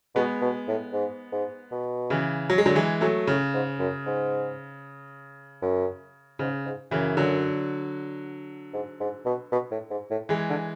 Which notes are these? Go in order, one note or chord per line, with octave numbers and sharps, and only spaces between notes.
B2 G#3 B3
B2
A2
G#2
G#2
B2
C#3 E3
F#3
G#3
D3 F#3
E3 G#3
F#3 A3
A2 C#3
G#2
F#2
G#2
F#2
G#2 C#3
G#2
F#2 C#3 E3
D3 F#3
G#2
G#2
B2
B2
A2
G#2
A2
E3 G#3
D3